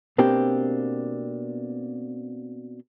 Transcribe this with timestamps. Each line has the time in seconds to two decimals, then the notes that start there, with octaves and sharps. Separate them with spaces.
0.18 B2 A#3 C4 D4 G4